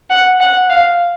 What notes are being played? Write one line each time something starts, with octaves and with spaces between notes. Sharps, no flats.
F#5
F#5
F5